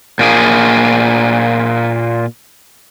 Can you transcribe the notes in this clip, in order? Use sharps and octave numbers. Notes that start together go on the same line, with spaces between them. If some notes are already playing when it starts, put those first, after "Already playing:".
A#2 A#3 G#4